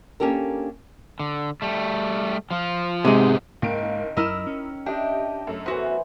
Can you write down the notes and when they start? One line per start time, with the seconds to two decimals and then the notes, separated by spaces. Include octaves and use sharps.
0.20 A#3 C#4 D4 G4 A4 A#4
1.20 D3
1.62 G3 A3
2.51 F3 F4
3.05 G#2 C3 G#3 B3 D#4
3.62 F#1 G#2 D#3 A#3 D7
4.17 F#2 E4 A#4 D#5 E6 F6 E7
4.47 C#4
4.86 D4 G4 D#5 E5
5.47 F#2 A3
5.66 E3 B3 F#4 C5